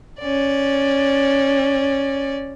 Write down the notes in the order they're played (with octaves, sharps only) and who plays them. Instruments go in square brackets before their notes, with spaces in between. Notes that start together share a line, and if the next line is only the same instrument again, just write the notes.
[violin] C#4 D5